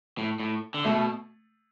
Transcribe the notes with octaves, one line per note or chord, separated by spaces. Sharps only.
A2
A2
D3
B2 A3